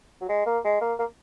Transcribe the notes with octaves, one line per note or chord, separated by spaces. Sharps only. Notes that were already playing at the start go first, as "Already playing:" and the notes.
F#3
G#3
A#3
G#3
A#3
A#3